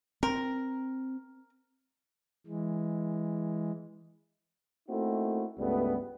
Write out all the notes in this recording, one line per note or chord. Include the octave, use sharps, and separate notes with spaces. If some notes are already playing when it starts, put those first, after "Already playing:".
C4 A#4
E3 G#3
A3 A#3 C4 D#4 E4 F#4
C#2 G2 G3 A3 B3